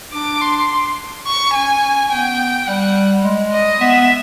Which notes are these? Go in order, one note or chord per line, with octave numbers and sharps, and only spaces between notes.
D4 D6
C6
C#6
C#4 G#5
B3 G5
G3 F#5
G#3
D#5
B3 E5